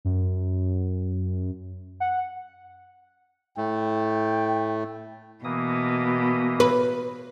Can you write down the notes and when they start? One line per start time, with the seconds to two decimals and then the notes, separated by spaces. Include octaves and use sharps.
0.05 F#2
2.00 F#5
3.57 A2 A3 G5
5.44 B2 E3 A#3 D#6
6.60 B4